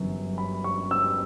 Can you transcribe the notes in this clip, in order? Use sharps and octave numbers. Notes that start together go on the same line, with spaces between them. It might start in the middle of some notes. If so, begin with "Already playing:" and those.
Already playing: G1 F#2 E3
B5
C#6
E6